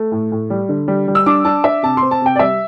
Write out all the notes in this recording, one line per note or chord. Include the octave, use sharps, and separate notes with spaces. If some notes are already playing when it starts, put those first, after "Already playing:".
Already playing: A3
A2
A2
G3
D3
G3
G3
E6
D4 D6
D4 A5
D4 E5
C3 A5
C6
C4
A5
C3 G5
D5
G3 E5